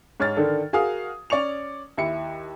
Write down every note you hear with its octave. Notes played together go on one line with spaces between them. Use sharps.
G#2 C#5 F6 A6
D3 D#3 D4 A4
F#4 G#4 A#4 F5 D#6
C#4 D5 C#6 C#7 F7
D#2 E4 C#7